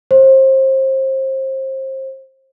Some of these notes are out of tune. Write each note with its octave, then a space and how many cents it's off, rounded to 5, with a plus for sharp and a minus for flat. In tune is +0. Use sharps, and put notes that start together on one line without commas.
C5 +30